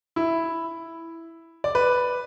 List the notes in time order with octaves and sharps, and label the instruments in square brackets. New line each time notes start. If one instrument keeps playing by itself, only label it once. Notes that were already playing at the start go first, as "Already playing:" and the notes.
[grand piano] E4
D5
B4